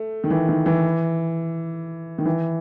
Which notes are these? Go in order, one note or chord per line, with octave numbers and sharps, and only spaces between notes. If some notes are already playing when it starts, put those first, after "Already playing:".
Already playing: A3
D#3
E3
D#3
E3
D#3
E3